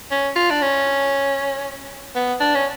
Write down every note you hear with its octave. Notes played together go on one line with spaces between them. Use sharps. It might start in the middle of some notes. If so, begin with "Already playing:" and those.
C#4
F4
D4
C#4
B3
D4
C#4